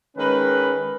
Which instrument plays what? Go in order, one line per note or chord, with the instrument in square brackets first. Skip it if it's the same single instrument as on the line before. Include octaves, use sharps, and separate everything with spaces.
[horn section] D#3 G#3 C#4 B4